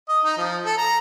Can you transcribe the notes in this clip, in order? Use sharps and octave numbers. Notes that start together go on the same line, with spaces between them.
D#5
D#4
F3
A4
A#5